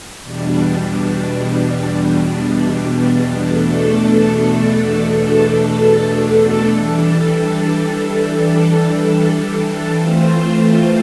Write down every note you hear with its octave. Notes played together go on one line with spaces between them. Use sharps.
E2 B2 G3 D4
E2 B2 A3 D4 A4
E3 G3 D4 A4
E3 A3 C4 F4 C5